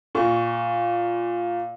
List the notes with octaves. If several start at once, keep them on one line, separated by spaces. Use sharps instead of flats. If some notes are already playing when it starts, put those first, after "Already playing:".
A#2 C#6